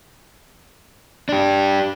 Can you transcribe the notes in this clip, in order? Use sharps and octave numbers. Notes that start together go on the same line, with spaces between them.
D4 G4